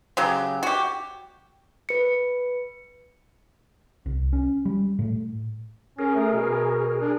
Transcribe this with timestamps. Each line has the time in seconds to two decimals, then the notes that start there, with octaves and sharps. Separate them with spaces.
0.17 C#3 F#3 G4
0.63 F#4 G4
1.89 B4 C#7
4.06 C2
4.33 C#4
4.65 G3
4.99 A2
5.99 C#4 G#4 A#4
6.15 A3
6.32 B2
7.01 D4